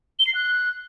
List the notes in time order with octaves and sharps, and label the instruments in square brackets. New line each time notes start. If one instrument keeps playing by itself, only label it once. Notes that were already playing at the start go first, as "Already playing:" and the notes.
[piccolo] G7
C7
F#6